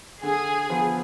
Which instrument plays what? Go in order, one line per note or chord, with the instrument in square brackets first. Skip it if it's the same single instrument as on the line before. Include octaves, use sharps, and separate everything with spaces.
[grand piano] D3 [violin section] G#4
[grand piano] F3 B3 F4